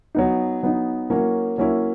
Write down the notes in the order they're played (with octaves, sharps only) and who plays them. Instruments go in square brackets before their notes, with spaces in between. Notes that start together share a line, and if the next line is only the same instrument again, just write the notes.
[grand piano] F#3 B3 D#4
F#3 B3 D#4
F#3 A#3 C#4 E4
F#3 A#3 C#4 E4